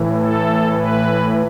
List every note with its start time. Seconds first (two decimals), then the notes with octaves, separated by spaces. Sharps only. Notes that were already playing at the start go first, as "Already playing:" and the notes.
Already playing: A2 E3
0.17 A4
0.74 B4